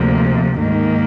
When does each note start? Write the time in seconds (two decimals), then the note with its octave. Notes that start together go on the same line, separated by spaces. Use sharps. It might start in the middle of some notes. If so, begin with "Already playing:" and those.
Already playing: D2 C3 F3 A#3
0.58 G#2 D#3 A#3